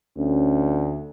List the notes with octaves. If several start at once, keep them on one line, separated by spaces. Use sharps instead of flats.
D2 C#4